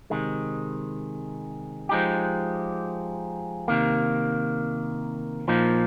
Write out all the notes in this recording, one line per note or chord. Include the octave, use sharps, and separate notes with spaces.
C3 D#3 G#3
F3 G#3 D#4 G4
C3 D#3 A#3
A#2 F3 A#3 D#4